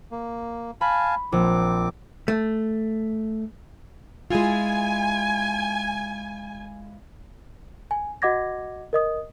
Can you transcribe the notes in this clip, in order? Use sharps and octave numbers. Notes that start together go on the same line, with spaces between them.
A#3
F5 G#5 A5 B5
A#1 C4 D6
A3
G#3 E4 F4 G#5
G#5
F#4 D#5 F#5 D6 G#6 A#6
A#4 D#5 D#6